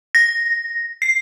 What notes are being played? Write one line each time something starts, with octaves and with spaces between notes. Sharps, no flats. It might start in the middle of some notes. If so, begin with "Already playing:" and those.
A#6
C7